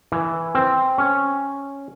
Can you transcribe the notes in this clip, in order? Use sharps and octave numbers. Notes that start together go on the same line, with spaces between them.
E3
C4
C#4